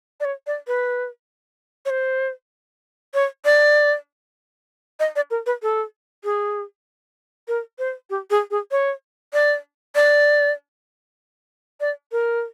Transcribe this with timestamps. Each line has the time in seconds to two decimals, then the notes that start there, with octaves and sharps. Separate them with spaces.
0.20 D5
0.25 C#5
0.47 D5
0.67 B4
1.85 C#5
1.90 C5
3.14 C#5
3.45 D5
5.00 D#5
5.16 D5
5.31 A#4
5.46 B4
5.63 A4
6.24 G#4
7.48 A#4
7.79 C5
8.10 G4
8.30 G#4
8.51 G#4
8.71 C#5
9.33 D5
9.95 D5
11.80 D5
12.12 A#4